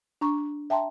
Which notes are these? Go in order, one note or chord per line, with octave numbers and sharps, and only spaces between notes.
D4 A#5 C#6
E5 G5 A5 A#5 C6